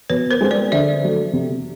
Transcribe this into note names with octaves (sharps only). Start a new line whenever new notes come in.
B2 B4 C#5
A#4 C5
G#3 C4
C5 D5
D3 D5 E5
F#3 A3
C3